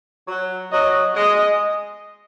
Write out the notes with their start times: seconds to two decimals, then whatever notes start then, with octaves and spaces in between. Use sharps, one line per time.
0.28 F#3
0.72 F#3 D#5
1.16 G#3 D#5